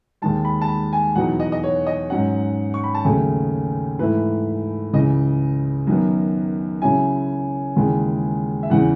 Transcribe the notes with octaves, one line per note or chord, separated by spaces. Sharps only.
D#2 D#3 G#3 A5
B5
A5
B5
G#5
E2 B2 F#3 B3 D#4 F#5
D#5
D#5
C#5
D#5
G#2 F#3 C#4 F#5
C#6
B5
A5
D#2 C#3 F#3 A3 G#5
G#2 E3 A3 E4 B4
C#2 C#3 E3 D#5
F#2 D#3 F#3 B3
C#3 F#3 C#4 E4 G#5
D#2 C#3 E3 G#3
E5
E2 C#3 E3 F#5